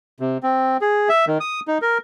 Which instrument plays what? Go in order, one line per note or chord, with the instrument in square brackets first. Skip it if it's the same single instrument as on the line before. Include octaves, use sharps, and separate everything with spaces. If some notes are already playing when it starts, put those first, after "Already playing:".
[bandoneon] C3
C4
G#4
E5
D#3
D#6
D#4
A#4